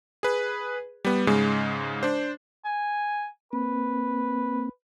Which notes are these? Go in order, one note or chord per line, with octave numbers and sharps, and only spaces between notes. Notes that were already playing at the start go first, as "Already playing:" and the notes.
G#4 B4
G3 B3
G#2 C#3 G#3
D4 C5
G#5
A#3 C4 B4